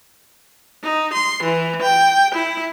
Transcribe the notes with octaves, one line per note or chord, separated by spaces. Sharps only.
D#4
C6
E3
G5
E4